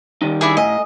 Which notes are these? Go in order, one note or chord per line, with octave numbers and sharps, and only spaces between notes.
D#3 G3 D#4
D4 E4 G#4
A2 D#5 G#5